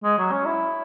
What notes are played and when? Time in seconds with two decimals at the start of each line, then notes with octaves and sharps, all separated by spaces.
0.04 G#3
0.18 F#3
0.32 C#4
0.46 E4